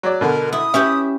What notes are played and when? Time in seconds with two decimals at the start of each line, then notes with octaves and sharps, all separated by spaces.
0.03 F#3 D5
0.21 B2 D3 A#4
0.52 E4 D#6
0.74 C#4 E4 G4 E5